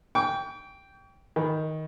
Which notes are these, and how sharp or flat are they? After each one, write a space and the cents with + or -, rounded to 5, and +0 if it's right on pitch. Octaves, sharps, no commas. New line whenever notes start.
G5 +0 C#6 +45
D#3 +10 B5 +0